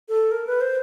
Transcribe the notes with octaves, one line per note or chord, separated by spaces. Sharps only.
A4
A#4
B4
C5